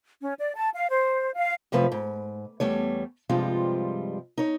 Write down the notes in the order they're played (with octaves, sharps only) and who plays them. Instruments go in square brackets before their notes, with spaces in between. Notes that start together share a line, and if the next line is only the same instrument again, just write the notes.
[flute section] C#4
D5
A5
F5
C5
F5
[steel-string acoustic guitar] F#2 C3 F3 A3 B4
G#2
E2 G3 A3 C#5
G2 C3 F3 G3 G#3 F4
D#4 C#5